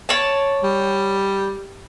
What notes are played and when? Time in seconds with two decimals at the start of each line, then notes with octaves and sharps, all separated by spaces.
0.09 C#5 D5 A5
0.64 G3